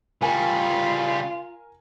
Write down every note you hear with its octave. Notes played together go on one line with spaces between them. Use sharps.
C#3 G3 F4 A#4 G#5